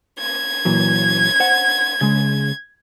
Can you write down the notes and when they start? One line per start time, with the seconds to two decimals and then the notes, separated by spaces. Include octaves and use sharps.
0.19 G#6
0.65 A#2 E3 F#3
1.40 C5 F#5
2.01 C#3 G#3